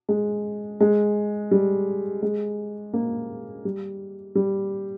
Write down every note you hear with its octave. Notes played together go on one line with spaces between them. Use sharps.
G#3
G#3
G3
G#3
A#3
G3
G3